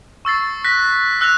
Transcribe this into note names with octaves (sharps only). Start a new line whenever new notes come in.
C#6 E6 A6 C7
F#6 A#6 B6
E6 F#6 A#6 F7